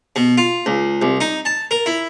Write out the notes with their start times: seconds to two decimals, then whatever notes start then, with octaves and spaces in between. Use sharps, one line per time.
0.16 B2
0.38 F4
0.66 C#2
1.02 C2
1.21 D#4
1.45 A5
1.71 A#4
1.86 E4